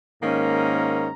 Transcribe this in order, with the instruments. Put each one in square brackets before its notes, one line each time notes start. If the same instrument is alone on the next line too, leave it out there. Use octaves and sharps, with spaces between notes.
[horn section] G#2 D#3 A#3 C#4 A#5